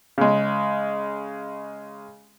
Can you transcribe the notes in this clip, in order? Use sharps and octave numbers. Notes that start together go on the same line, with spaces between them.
C#3 G#3